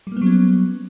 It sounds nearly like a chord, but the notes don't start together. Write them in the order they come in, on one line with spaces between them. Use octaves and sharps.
G3 A#3 B3 F#3 C#4